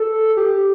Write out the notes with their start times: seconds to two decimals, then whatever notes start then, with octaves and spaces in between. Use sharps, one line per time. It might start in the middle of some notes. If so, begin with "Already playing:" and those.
Already playing: A4
0.37 G4